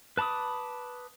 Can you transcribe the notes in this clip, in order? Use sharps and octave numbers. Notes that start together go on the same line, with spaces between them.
B4 A5 B5 D6 D#6